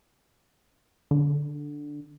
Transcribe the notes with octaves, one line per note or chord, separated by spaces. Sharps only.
D3